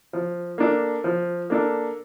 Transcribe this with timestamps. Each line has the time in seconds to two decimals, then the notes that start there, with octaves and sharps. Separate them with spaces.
0.13 F3
0.58 A#3 D4 A4
1.04 F3
1.50 A#3 D4 A4